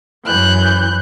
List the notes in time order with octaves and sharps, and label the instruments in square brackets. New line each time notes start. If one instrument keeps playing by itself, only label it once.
[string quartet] F#2 E3 F#6 G6